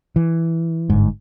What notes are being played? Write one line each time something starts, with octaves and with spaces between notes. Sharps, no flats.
E3
G1 G#2